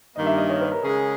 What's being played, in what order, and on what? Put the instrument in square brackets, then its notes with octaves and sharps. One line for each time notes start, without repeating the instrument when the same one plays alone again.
[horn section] G2 D#3 A#3 [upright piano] D#5
[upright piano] E5
D#5
C#5
B4
A#4
[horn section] C#3 G#3 C#4 G#4